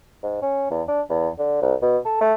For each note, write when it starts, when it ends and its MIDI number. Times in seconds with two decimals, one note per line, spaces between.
0.23 0.39 44
0.42 0.70 61
0.71 0.82 40
0.88 1.01 62
1.10 1.29 40
1.39 1.58 50
1.62 1.74 36
1.82 1.98 47
2.05 2.18 69
2.21 2.34 57